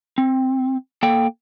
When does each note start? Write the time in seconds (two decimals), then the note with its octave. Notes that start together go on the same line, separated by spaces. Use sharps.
0.18 C4
1.03 A#3 A4 G5